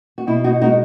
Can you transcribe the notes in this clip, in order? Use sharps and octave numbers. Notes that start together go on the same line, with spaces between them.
F#4
B2 E4
D#4 F#4
G#3 D#4 F#4